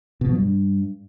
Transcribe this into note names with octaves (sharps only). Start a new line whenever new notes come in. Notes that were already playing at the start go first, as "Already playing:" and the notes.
B2
F3
G2